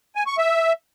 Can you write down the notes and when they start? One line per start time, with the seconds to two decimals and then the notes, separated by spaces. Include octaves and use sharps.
0.15 G#5
0.27 C#6
0.38 E5